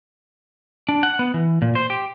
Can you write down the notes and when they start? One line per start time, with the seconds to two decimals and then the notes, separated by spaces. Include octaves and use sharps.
0.89 D4
1.03 F#5
1.19 B3
1.34 E3
1.62 A#2
1.75 C5
1.90 G4